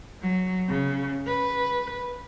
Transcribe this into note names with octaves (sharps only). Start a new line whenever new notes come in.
F#3
C#3
B4